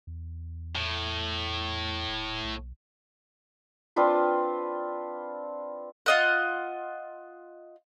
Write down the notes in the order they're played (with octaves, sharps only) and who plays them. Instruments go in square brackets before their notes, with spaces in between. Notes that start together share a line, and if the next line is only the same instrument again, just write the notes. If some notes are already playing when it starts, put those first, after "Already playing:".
[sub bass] E2
[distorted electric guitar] A2
[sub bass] D#1
B1
[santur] C4 D4 F4 B4
[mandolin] F4 D#5 F#5